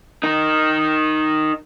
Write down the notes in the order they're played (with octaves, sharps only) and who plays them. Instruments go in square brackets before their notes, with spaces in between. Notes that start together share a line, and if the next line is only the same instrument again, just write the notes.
[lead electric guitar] D#4 A#4